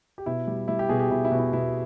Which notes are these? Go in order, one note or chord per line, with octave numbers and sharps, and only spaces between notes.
G4
B2 E4
G3
G3 E4
G4
B2 G#4
G4
B2 E4
E4
B2
E4
B2 E4